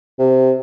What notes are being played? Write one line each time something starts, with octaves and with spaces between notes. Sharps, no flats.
C3